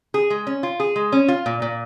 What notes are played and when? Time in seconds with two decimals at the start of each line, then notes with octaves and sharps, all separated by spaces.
0.14 G#4
0.30 G#3
0.47 C#4
0.63 F4
0.80 G#4
0.96 G#3
1.12 C#4
1.28 F4
1.46 A#2
1.62 A#2